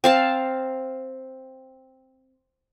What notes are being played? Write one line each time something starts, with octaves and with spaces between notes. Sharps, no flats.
C4 F5 A5